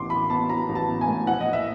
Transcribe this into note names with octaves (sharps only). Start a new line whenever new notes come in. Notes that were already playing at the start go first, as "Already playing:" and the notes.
Already playing: A1 B3 C6 D6
F#3 B5
B3 A5
F#3 A#5
A1
A5
B3
G#5
A2
A#1 F#5
D#5
A#2
E5